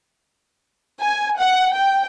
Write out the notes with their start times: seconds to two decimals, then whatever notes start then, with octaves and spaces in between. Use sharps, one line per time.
1.00 G#5
1.36 F#5
1.73 G5